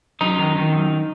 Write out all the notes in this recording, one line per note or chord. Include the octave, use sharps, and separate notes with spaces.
F#2 D#4
D#3
D#3
F#2